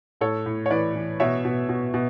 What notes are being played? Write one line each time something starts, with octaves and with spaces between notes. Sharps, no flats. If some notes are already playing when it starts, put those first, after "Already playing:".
A2 A4 C#5
A2
C#5
E3 B4 D5
E3
B2 C#5 E5
B2
B2
B2